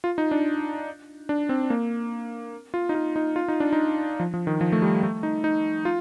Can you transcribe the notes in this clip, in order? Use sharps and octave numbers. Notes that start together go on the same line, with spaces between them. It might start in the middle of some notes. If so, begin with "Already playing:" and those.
F4
D#4
D4
D4
C4
A#3
F4
D#4
F4
D#4
F4
D#4
D4
D#4
F3
F3
D#3
F3
A3
G3
A3
D#4
D#4
F4